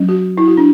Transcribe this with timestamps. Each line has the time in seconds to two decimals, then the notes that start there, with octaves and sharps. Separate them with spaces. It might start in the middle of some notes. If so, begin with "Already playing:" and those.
Already playing: F#3 C#4
0.09 F#4
0.38 E4
0.47 F#4
0.57 D4